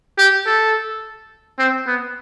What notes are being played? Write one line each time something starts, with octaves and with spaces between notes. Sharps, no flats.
G4
A4
C4
B3